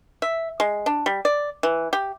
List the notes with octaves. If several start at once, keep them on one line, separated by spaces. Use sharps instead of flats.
E5
G#3
D4
G3
D5
E3
G4